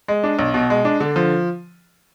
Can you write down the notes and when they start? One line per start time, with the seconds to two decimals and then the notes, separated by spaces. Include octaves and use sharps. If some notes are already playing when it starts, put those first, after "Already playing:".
0.08 G#3
0.24 D4
0.39 B1
0.54 B2
0.70 G#3
0.85 D4
1.00 D3
1.16 F3